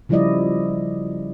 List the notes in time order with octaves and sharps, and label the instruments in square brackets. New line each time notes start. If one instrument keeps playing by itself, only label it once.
[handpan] C#3 F3 G3 E4 D5 D#5